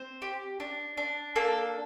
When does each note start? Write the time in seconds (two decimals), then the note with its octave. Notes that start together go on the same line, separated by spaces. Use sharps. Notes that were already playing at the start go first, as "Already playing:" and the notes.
Already playing: C4 C5
0.22 G4
0.60 D4
0.97 D4
1.36 A#3 A4